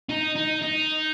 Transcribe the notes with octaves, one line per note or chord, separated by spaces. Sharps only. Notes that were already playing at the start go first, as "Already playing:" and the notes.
D#4
D#4
D#4